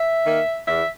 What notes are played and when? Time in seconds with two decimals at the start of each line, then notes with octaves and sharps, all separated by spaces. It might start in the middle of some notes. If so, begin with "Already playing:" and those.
Already playing: E5
0.26 D#3 A#3
0.68 E2 E5